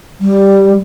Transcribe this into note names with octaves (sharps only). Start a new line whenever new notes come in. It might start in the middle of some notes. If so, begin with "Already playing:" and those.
G3